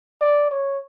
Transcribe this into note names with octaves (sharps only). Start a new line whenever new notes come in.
D5
C#5